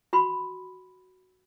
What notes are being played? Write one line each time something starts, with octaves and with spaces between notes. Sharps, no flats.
F#4 B5 C6